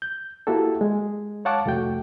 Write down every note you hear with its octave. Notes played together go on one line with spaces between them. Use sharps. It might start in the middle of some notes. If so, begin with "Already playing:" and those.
G6
A#3 E4 F#4 G4 A4
G#3
C#5 F5 F#5 A5 C#6 D6
C2 F2 A3 F#4 G5